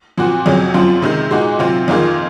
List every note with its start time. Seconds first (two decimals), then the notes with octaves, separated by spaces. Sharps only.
0.18 A#2 F3 C4 F#4
0.46 F2 C3 F#3 C#4 G#4
0.74 F#2 F3 C4 F4
1.02 C3 D#3 G#3
1.31 A#2 G#3 D#4 F#4
1.59 C3 F#3 C4 F4
1.88 F2 D#3 A#3 F4 G#4